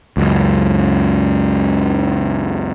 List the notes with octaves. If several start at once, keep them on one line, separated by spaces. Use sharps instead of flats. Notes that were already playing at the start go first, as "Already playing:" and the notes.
C#2 F#2